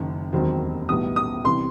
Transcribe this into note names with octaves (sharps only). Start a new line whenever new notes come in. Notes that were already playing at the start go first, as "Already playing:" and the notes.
Already playing: F#1 F#2 D#3
E1 D#2 D#3 F#3 C4
B1 A2 E3 G3 B3 D#6
D#6
C2 C3 E3 G3 C6